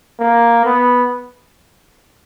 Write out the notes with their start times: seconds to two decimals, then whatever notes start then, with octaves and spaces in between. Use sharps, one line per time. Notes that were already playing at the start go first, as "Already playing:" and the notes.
0.20 A#3
0.65 B3